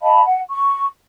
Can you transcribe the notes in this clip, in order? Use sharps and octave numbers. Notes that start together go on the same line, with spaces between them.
D#5 F5 A5 B5
F#5
C#6